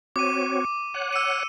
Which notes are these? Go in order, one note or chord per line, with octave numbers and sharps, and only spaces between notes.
C4 F#4 C#5 D6 D#7
C#5 F#5 F#6
E6 C#7 D#7